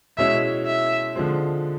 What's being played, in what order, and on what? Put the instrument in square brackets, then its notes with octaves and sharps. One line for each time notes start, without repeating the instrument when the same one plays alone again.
[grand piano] B2 G#3 C#4 E4 [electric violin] E5
[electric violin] E5
[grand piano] D3 F3 G#3 C4